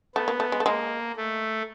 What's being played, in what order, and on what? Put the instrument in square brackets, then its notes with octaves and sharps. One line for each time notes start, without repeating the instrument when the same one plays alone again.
[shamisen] A3 [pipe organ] B3
[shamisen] A#3
A3
G#3
A3
[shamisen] G#3 [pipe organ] A#3
[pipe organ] A3